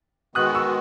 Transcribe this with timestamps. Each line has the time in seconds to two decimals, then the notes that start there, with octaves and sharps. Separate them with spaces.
0.35 D#3 G#3 B3 F#4 D#6 F#6
0.55 C#6 E6